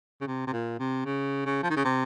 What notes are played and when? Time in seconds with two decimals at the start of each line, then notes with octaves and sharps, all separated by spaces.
0.21 C#3
0.27 C3
0.47 C3
0.53 A#2
0.79 C3
1.05 C#3
1.45 C#3
1.63 F3
1.70 D#3
1.76 C#3
1.84 C3